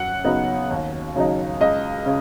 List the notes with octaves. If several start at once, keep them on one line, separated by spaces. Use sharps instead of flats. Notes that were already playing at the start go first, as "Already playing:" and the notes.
Already playing: F#2 F#5
C#3 F#3 B3 D#4
D#2
C#3 F#3 D#4
C#2 D#5
C#3